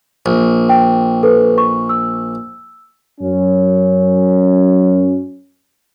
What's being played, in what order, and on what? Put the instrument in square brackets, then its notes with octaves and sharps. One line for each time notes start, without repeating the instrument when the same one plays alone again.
[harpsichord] A#1
[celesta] G5
A4 B4
C#6
E6
[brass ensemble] F#2 C#4